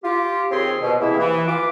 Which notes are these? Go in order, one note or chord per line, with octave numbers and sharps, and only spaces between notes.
F4 G4
D#2 C4 F4 G#4 C#5 C6
B2
C3 E3 A#3 E4 G#4 E5
E3
F4 B4 D6